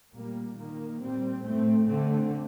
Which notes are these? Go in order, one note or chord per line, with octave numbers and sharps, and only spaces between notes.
A#2 G3 A#3
D#3 A#3
A#2 G3 C4
A2 A3 C4
D3 A3 C4